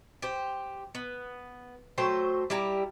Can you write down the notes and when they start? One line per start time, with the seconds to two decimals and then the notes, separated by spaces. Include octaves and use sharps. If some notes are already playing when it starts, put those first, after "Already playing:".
0.22 G4 C5
0.95 B3
1.98 F#3 A3 C5 G5
2.50 G3 E4 G4 A#5